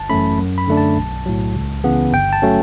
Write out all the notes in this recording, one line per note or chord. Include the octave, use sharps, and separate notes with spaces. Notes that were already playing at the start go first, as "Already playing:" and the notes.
Already playing: G1 A5
F#2 E3 A3 C#4 B5
F#2
B5
D3 A3 D4
A5
B1
A2 F#3
C#2
C#3 E3 B3
G1 G5
A5
F#3 A3 C#4